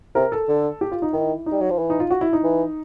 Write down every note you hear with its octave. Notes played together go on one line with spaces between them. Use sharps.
C3 A#4
A4
D3
G4
F4
D#4
D#3 E4
D#4
G3
F#3
F3
E3
D#4
F4
F#4
E4
D#4
E3